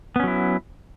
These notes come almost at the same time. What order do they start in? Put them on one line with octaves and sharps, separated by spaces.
B3 C#4 F#3 E4